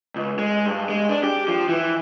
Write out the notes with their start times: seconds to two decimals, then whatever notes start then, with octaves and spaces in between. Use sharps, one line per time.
0.16 C#2
0.39 G#3
0.66 G2
0.89 G#3
1.09 D4
1.23 G4
1.48 F3
1.69 E3